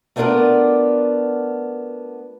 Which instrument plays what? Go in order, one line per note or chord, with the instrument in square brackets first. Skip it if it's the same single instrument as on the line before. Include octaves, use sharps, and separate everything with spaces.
[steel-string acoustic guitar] A3 B3 D4 F4 A#4 D5